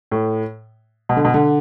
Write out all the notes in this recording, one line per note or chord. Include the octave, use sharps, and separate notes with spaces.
A2
B2
D3
B2
D3